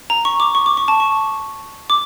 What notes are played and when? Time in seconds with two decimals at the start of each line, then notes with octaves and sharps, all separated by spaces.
0.10 A#5
0.25 C#6
0.40 D6
0.55 C#6
0.66 D6
0.77 C#6
0.88 A5
1.00 C#6
1.90 D6